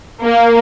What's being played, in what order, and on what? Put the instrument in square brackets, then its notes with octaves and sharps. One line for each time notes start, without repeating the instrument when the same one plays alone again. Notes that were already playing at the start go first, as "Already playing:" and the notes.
[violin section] A#3